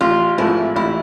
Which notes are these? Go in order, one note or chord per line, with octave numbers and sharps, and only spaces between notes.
A1 F4
G#2 F3 A3 E4
A1 E4